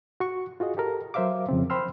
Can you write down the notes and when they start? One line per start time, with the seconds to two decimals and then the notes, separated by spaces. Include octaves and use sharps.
0.20 F#4 C#6
0.60 F4 F#4 G#4 D#5
0.77 G4 A4 A#4
1.14 F#3 A#4 C5 E5 F5 D6
1.49 F2 C#3 C4
1.70 C5 G5 B5 C6 E6 F6